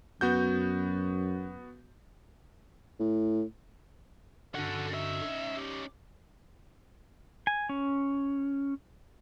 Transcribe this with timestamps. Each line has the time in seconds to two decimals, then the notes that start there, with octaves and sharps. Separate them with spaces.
0.21 F#2 B3 F#4 G6
3.00 A2
4.55 G2 D3 C#4 D#4 F#4 A4 F#5
4.94 E5
5.55 G4 D6
7.47 G#5
7.69 C#4